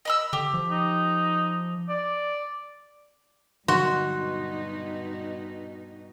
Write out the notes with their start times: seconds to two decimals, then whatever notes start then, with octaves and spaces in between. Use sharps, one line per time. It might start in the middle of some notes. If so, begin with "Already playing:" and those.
0.05 D#5 B5 E6
0.33 D3 G4
0.54 F3
0.70 D#4
1.89 D5
3.68 G2 B2 D3 F#3 D#4 F#4 C6